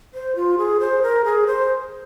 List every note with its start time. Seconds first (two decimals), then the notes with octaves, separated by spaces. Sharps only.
0.14 C5
0.36 F4
0.58 G#4
0.80 C5
1.02 A#4
1.25 G#4
1.47 C5